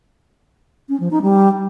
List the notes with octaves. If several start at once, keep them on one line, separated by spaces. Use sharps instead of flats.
C#4
F3
D#4
G3